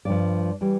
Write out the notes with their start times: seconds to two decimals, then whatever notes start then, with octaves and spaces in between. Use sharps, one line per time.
0.05 G2 F3 D5
0.61 E3 G3